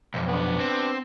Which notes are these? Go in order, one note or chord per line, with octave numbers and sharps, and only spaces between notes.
B1 F2
B3 D4
C4